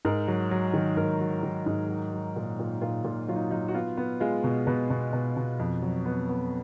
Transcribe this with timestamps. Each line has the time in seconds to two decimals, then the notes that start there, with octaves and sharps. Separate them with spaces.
0.05 G#2 A#4
0.28 F#3
0.51 F#3
0.74 D#3
0.97 G#2 A#4
1.21 F#3
1.43 D#3
1.66 G#2
1.89 F#3
2.13 F#3
2.36 A#2
2.59 A#2
2.81 A#2 F4
3.05 A#2
3.28 F#3 F4
3.35 D#4
3.51 F#3 D#4
3.68 F#4
3.74 B3 F4
3.97 B3
4.20 G#3 F4
4.44 B2
4.67 B2 B4
4.90 B2
5.13 B2
5.37 B2
5.60 F2
5.82 F#3
6.06 B3
6.29 B3